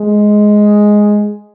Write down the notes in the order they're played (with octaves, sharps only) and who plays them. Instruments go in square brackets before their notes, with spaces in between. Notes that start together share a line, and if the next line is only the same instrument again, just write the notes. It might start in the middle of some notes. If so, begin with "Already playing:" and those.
Already playing: [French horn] G#3